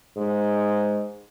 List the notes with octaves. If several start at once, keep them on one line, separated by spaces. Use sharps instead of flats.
G#2